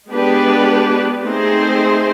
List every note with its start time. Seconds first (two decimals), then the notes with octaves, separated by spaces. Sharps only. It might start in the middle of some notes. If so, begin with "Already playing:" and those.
0.10 G#3 B3 D4 G4 B4
1.25 A3 C4 D#4 G#4 C5